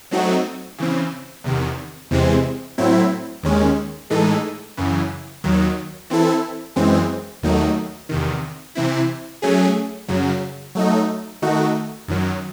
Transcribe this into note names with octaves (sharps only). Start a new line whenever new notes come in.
F#3 A3 C4 D#4 F#4
C#3 E3 C4
E2 C3 D#3
E2 C3 E3 G#3 C4
A2 F#3 C4 E4
D#2 D#3 G#3 C#4
A2 E3 G#3 D#4 A4
F#2 C#3 E3
D#2 D#3 F#3
E3 C4 E4 A4
F#2 E3 G#3 C4
D#2 D#3 F#3 A3 D#4
E2 C3 D#3
C3 E3 C4 E4
F#3 A3 C#4 G#4
F#2 C#3 F#3
F#3 A3 D#4
D#3 A3 D#4 F#4
F#2 D#3 F#3